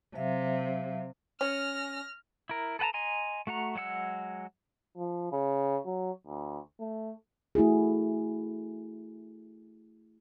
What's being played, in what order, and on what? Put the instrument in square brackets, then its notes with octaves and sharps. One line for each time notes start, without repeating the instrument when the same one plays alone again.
[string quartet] C3 [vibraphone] F#3 E5 F5
[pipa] C#4 [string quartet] F6 A#6
[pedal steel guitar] E4 A#4
A4 B4 F#5 A5 A#5
D#5 G#5 A#5 C6
A3 F#4 F#5 A#5
F#3 G#3 F#5 E6
[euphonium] F3
C#3
F#3
D2
A3
[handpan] A3 E4 F#4 G#4